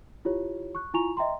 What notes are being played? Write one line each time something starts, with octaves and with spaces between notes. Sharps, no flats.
E4 F4 G4 C#5
C#6 F#6
E4 F4 G#5 A#5 C#6 F7
D#5 E5 G5 A#5 C6